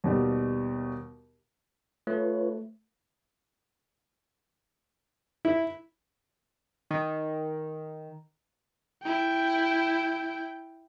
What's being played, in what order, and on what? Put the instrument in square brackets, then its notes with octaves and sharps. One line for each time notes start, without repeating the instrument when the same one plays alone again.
[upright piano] D#2 B2 G3
[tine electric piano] A3 [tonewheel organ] F4 B4 C#5
[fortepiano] E4
[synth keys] D#3
[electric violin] E4 G5